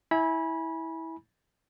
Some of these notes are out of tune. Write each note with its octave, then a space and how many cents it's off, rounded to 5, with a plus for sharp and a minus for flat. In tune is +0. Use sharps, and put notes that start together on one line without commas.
E4 -20 G#5 +5 B5 -25